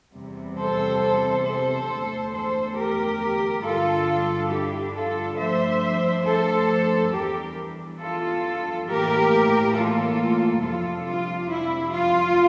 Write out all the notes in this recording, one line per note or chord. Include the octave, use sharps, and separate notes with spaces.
E2 C3 G3
A4 C5
A4 C5
E2 D3 A3
A4 C5
G4 A#4
G2 D3 G3 D4 F4 A4
E4 G4
F4 A4
G2 F3 A3 D4 C5 E5
A4 C5
E2 E3 G3 D4 G4 A#4
F4 A4
A2 E3 A#3 G4 A#4
F4 A4
F2 C3 G3 D4 F4 A4
F4
E4
F4